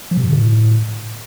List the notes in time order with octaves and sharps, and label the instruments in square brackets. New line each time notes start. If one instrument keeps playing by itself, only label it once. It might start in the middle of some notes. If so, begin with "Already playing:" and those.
[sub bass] F3
C3
G2
D3
A2